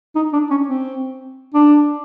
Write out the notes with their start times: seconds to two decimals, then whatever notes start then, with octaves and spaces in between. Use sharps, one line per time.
0.16 D#4
0.33 D4
0.51 C#4
0.69 C4
1.54 D4